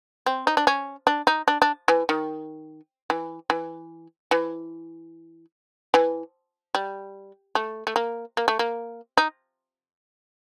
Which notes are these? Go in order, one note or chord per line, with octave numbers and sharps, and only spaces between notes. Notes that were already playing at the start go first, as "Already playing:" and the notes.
C4
D#4
D4
C#4
D4
D#4
D4
D4
E3
D#3
E3
E3
E3
E3
G3
A3
A3
A#3
A#3
A3
A#3
D#4